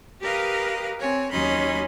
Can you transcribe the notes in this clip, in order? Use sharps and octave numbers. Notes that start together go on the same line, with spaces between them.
G4 A#4 B4 D#5 F5
C4 C#5 G#5
D#2 F#3 C#4 D#4 B5 C6